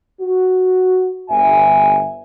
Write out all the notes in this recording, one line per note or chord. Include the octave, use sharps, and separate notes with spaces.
F#4
G1 E5 G#5